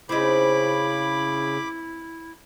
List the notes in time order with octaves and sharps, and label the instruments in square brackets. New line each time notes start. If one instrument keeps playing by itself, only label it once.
[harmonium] C#3 [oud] C4 D#4 [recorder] E4 [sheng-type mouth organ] B5 D6